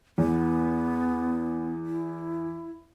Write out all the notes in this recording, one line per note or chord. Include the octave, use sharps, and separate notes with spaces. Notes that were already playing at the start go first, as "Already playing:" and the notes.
E2 B3
E4